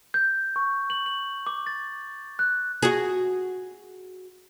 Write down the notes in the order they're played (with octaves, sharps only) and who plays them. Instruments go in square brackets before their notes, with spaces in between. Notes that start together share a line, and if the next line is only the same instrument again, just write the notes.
[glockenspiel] G6
C#6
F#7
F#7
D6
A6
F#6
[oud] F#4 G#4